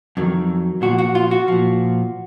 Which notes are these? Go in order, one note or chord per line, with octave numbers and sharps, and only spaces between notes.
F2 D#3 F#3
A#2 F3 F#4
F#4
F4
F#4
A#2 F3